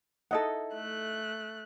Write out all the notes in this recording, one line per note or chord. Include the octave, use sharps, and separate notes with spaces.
D#4 E4 A4 D#5 F#5
A3 F#6